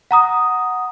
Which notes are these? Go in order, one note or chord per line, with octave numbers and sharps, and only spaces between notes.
F#5 A#5 D#6